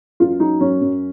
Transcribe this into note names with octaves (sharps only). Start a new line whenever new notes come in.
F#2 F4
F#3 D#4
F#2 C#4
F#2